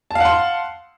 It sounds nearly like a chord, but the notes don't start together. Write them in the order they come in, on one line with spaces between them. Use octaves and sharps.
A5 F5 F#5 C6